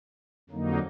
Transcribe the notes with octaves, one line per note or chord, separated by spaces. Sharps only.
F2 D3 F#3 A#3 D#4